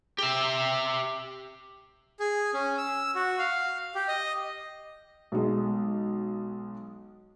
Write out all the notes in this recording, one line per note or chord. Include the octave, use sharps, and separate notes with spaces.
G4 E5
G#4
C#4
E6
F#4
F5
G4
D#5
B1 G#3